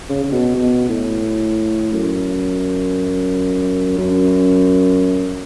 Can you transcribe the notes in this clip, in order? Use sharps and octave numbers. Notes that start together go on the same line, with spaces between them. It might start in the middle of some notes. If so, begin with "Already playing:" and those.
C#3
C#3
B2
B2
A2
F#2
F#2